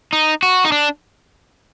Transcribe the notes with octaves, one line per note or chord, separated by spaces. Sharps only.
D#4
F#4
D#4
D4